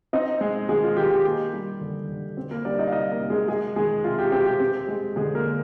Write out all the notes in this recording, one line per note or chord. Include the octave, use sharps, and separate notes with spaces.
C4 D#4 D#5
G#3 G#4
D#3 G#3 G#4
F4
D#3 G4
G4
A#3 G4
G3
D3
D3
C4
A#3 A#4
G3 D4 D5
D#4 D#5
F5
C3 D#4 D#5
A#3 A#4
C3
G#3 G#4
G#3 G#4
D#3 G#3 G#4
C3 F4
G4
C4 G4
G4
C4
G#3
D3 G#3 G#4
A#3 A#4
D3